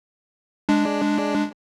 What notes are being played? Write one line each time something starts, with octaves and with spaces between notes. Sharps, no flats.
G#3 D4